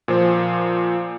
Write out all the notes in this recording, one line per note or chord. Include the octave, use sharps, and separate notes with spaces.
A#2 F3 C5